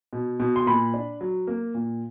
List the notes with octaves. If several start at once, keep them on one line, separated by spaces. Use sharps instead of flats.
B2
B2
C6
A#2 B5
D4
F#3
A#3
A#2